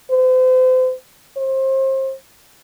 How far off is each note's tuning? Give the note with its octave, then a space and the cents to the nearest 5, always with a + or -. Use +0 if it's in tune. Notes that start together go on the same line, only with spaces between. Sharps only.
C5 -35
C5 +30